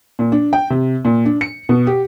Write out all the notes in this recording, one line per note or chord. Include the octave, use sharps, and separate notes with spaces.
A#2
D4
G5
C3
A#2
D4
C#7
B2
G4